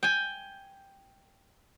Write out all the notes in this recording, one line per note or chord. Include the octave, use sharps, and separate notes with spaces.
G5 G#5